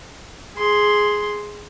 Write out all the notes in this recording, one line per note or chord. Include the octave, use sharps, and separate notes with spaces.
G#4 C6